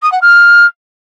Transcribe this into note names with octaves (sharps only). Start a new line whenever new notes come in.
D#6
F#5
F6